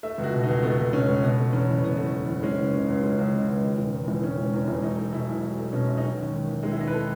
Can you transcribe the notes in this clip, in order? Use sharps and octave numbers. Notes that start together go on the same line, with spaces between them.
A3 E5
C#2
F#4
B2
C#2 D#4
A3 B3
C#2
B2 C#4
C#2
B2 B3
A3
E2 C#4
F#1
B2 B3
A3
E2
F#1
G#3 C#4
C#2
C#3 C#4
C#2
G#3 C#4
C#2
C#3
C#2
D#3
E1
E2
E1
D#3 C#4
E1
E2 C#4
E1
F#3 D#4
A3
B2 E4
B1
F#3
A3
B2 C#4
B1
D#4
G#3 C#4
D#2
D#3
D#2
G#3 D#4
E4
D#2 D#4
B4
D#3 A4